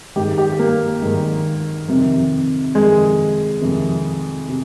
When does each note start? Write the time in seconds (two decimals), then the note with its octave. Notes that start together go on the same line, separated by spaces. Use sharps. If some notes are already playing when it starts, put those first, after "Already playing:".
0.16 G#2 D#3 G4
0.38 G4
0.59 A#3
1.02 G#2 D#3
1.88 F2 C3 D#3
2.75 F2 C3 D#3 G#3
3.61 F2 C3 D#3
4.49 C3